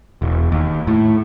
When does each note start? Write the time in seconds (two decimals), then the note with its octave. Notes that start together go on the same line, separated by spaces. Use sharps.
0.22 E1
0.52 D#2
0.87 A2